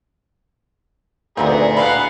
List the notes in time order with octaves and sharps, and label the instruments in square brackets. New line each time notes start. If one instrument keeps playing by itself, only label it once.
[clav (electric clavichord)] D2 A#2 [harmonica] B3 G#4 A#5 [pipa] C4 D#4 B4
[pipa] D3 E3 B5 [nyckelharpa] F5 F#5